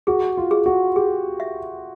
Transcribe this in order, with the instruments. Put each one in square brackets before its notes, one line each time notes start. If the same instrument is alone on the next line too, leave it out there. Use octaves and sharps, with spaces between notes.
[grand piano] F#4 [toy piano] G#4
[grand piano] F4
[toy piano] G#4
[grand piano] F#4
[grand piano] G4 [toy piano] G#4
[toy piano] E5